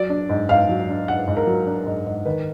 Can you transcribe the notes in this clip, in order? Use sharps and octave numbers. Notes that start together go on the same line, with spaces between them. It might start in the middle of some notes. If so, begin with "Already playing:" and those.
Already playing: F#3 D5
D4
G#2
G#2 F5
F#3
D4
G#2 F#5
G#2
A#4
F#3
D4
G#2
G#2
D#3 B4